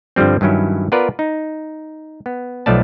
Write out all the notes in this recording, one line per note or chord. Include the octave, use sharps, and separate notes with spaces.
G2 D3 F3 G3 C4
G2 D#3 F#3 C#4 E4
B3 F4 A#4 B4 D5
D#4
B3
B1 F3 A3 B3 D5 A5